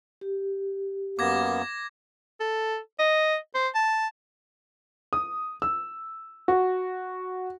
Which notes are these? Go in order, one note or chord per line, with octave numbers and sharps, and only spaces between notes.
G4
F#2 A#3 B3 D6 G#6 A#6
A4
D#5
C5
A5
D#6
E6
F#4